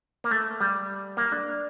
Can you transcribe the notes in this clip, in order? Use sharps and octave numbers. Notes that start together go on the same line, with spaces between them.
A#3
A3
G3
A#3
D4